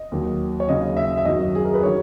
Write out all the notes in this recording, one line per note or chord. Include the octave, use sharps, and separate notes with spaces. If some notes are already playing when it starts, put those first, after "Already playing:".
Already playing: D#5
D#2 D#3 F#3
C#5
D#2 C#3 F#3 D#5
E5
E5
F#2 D#3 F#3 D#5
G#4
A#4
B4
D#3 F#3 C#5